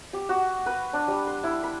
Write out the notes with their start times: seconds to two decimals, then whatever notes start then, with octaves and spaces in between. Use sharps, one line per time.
0.13 G4
0.29 F#4
0.66 B4
0.93 D4
1.08 G3
1.27 C6
1.43 E4
1.63 B5